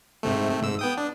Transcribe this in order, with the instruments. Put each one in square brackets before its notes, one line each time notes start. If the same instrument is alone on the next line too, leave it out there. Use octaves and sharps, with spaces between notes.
[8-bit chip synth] G#2 C3 A3
C3 A3
G#2 E6
B3 G5 D#6
D4